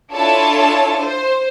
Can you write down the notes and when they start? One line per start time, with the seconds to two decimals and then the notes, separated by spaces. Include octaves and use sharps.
0.14 D4 E4 F4 A4 C#5 A5
1.01 C5